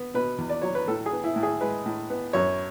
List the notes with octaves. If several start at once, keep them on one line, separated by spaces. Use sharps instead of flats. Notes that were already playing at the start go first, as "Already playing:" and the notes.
Already playing: B3
B2 B4
E2
D5
F#3 C#5
B4
A2 A4
G#4
B3
E4
A2
G#4
G#3 B4
A2
B3
F#2 C#5